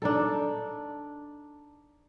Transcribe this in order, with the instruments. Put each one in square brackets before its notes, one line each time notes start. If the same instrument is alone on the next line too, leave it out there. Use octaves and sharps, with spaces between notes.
[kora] D4 D#4 A4